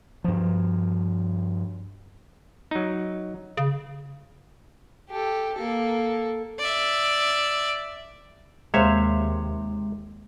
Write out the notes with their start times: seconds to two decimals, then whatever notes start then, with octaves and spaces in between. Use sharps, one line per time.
0.24 G2 F3
2.71 F#3 D#4
3.57 C#3
5.09 G4 A4
5.55 A#3 A4
6.59 D5 E5
8.74 D#2 C3 G#3 C5 C#5 E5 F5